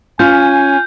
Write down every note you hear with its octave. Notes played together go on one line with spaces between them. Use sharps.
C#4 F4 G#5 G6